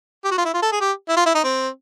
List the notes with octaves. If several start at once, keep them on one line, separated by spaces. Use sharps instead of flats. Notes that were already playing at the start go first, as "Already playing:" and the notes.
G4
F#4
F4
E4
F4
A4
G#4
G4
E4
F4
E4
D#4
C4